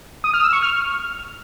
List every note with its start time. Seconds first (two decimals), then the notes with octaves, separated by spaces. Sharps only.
0.24 D#6
0.34 F6
0.43 E6
0.53 C#6
0.62 F6